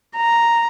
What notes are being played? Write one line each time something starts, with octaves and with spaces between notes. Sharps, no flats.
A#5